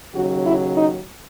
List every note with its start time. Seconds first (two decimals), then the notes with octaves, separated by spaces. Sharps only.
0.14 D#2 C#3 F#3 F#4
0.44 E4
0.76 D#4